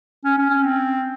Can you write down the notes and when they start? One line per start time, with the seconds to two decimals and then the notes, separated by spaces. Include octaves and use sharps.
0.24 C#4
0.38 C#4
0.50 C#4
0.64 C4